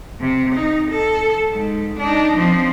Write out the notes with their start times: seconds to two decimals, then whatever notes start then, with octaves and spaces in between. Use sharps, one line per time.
0.20 C3
0.55 D#4
0.90 A4
1.51 G#2
1.99 D4 D#4
2.36 F3 C4